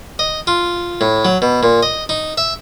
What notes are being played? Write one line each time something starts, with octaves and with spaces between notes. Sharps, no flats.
D#5
F4
A2
F#3
B2
A#2
D#5
D#4
E5